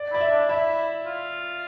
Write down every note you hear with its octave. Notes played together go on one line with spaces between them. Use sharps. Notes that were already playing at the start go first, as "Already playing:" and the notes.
Already playing: D5
E4 D5
E5
D4
E4 E5
F4